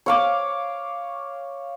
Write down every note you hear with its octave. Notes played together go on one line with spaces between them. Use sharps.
C#5 F5 D6